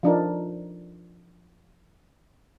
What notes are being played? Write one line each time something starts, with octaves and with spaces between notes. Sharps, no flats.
F3 D4 D#4 A#4